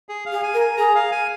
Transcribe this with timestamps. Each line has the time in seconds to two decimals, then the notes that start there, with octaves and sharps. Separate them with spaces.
0.09 G#4
0.26 F5
0.32 G#4
0.43 G#5
0.54 A#4
0.61 G#5
0.77 G#4 A#5
0.95 F5
1.12 G#5